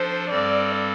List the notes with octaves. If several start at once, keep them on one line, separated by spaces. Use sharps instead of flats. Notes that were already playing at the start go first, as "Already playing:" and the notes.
Already playing: F3 D4 A4 C5
G2 G3 C4 A4 D5